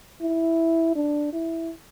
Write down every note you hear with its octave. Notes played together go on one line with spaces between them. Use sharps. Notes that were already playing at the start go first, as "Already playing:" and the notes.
E4
D4
E4